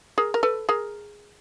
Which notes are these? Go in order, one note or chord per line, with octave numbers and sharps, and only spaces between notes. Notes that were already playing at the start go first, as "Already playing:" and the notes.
G#4 A#4
A#4
A4 B4
G#4 A#4